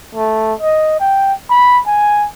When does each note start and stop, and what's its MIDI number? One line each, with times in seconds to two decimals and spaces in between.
0.15 0.53 57
0.61 0.98 75
1.00 1.33 79
1.50 1.79 83
1.87 2.27 80